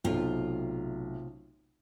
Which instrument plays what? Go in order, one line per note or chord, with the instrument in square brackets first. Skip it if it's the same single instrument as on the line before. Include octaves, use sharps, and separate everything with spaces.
[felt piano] B1 [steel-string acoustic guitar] A2 C3 F4